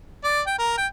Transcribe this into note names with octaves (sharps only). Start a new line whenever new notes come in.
D5
G5
A#4
G5